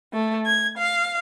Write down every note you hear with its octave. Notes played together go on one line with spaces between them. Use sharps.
A3
G#6
F5